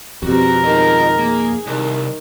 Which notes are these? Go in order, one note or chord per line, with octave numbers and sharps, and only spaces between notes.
F2 B2 G3 C4 F#4 A#4
D#3 G#3 F4 D#5
A#3 G#4
C2 D#3